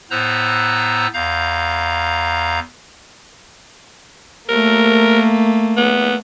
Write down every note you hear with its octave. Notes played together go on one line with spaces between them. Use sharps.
A2 B3 C5 A#5 E6 F#6
E2 F5 A#5 G6
A3 A#3 A#4
B3